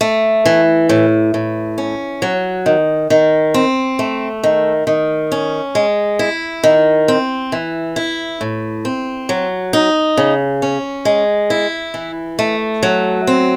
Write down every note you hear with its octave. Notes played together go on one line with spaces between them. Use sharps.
A3
E3
A2
A2
C#4
F#3
D#3
D#3
C4
A3
D#3
D#3
C#4
G#3
E4
D#3
C4
E3
E4
A2
C4
F#3
D#4
C#3
C#4
G#3
E4
E3
A3
F#3
C4